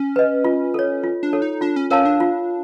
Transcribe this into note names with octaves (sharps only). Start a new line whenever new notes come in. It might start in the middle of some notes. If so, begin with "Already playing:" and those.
Already playing: C#4
B4 D#5
F4
A4 C#5
F4
D4
A4 C#5
D#4
D4 F4
C#4
C#4 A#4 C#5 F5 A5
D4
F4